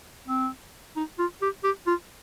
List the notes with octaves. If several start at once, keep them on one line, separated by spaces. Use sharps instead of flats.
C4
D#4
F4
G4
G4
F4